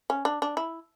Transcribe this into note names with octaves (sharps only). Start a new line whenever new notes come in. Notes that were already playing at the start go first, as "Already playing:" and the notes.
C#4
D4
D4
E4